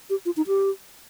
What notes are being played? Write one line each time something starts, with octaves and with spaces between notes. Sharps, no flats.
G4
F4
D#4
G4